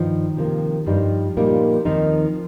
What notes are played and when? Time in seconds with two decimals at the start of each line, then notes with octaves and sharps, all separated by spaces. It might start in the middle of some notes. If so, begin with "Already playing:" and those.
Already playing: G2 D#3 F3 D#4
0.37 C3 F3 A#3
0.86 G2 F3 G3 D#4
1.37 A#2 G3 A#3 D#4
1.85 D#2 D#3 F3 C4 D#4